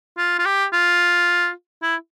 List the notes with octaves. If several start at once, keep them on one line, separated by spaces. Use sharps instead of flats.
F4
F4
G4
F4
E4